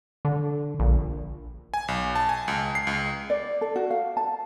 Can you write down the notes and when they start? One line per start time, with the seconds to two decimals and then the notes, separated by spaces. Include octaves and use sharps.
0.25 D3
0.80 A#1
1.74 G#5
1.88 B1
2.15 A5
2.29 G#5
2.48 C#2
2.75 C7
2.87 C#2
3.30 D5
3.61 A4
3.76 F#4
3.91 F5
4.17 A5